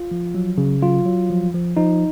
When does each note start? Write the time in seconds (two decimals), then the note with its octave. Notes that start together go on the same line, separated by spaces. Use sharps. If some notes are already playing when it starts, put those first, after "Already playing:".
Already playing: F4
0.11 F3
0.35 F#3
0.58 C#3
0.82 F#3 F4
1.05 F#3
1.30 F3
1.54 F3
1.77 F3 D#4